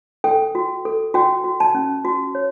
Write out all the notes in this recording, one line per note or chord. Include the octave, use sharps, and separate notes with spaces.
A4 G5
F#4
A4
F#4 G5
F#4
A5
C#4
F#4
C#5